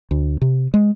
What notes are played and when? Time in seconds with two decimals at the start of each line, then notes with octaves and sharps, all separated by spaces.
0.11 D2
0.42 C3
0.74 G#3